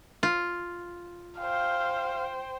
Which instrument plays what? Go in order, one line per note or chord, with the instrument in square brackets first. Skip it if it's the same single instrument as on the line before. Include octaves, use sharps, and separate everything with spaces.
[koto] F4
[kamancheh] C5 G5 [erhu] F5